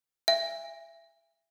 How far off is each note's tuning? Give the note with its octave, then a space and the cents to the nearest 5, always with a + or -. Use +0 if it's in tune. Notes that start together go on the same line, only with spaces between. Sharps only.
E5 +25 G#5 -30